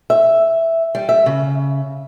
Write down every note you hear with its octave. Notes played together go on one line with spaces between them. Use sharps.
E5
G3
E5
C#3